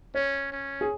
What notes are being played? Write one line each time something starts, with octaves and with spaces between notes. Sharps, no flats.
C#4 C#5
C#4
G#4